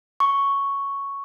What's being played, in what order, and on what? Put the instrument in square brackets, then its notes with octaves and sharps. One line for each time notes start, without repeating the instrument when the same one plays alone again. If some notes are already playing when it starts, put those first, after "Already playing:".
[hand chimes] C#6